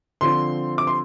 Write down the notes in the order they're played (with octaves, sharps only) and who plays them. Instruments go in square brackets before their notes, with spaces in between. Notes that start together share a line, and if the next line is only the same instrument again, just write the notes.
[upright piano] D3 F3 C4 C6
D6
C6